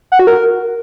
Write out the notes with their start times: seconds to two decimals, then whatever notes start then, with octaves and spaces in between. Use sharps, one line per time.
0.12 F#5
0.19 F#4
0.27 A#4